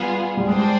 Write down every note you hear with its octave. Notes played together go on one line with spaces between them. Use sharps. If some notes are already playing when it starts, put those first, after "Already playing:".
Already playing: G3 B3 F4 G#4
G3
G#3 D4 G#4 C5 G5